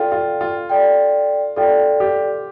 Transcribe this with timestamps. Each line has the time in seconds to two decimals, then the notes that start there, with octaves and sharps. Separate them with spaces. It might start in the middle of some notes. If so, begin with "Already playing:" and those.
Already playing: F4 A4 D5 G5
0.12 F4
0.41 F4
0.70 A4 D5 G5
1.56 F4 A4 D5 G5
2.00 G4